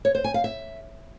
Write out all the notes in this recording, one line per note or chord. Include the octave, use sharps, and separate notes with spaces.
C#5
C5
G#5
F5
E5